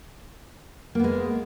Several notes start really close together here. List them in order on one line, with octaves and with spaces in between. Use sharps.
A#3 B3 G#3